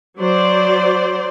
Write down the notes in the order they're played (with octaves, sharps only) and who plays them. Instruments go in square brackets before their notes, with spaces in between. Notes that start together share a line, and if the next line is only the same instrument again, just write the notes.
[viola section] F#3 C5 D5